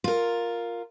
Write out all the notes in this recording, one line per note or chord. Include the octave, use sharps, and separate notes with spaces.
F4 A#4